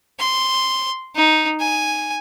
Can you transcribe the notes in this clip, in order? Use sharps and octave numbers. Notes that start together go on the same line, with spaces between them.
C6
D#4
G#5